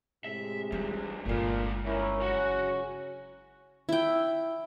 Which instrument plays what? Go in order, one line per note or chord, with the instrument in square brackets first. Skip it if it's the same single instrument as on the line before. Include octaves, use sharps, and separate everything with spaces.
[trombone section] A2 C3 G#3 [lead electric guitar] E5
[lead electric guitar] E2 G#2 [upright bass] G3
[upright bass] G1 G#3 [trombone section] A#2 D3 [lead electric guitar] A3 F4
[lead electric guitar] D#3 G3 [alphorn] C#4 [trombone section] E4 A#4
[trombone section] C#3 F#3 [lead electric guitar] F#4 F#5
[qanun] E4 G5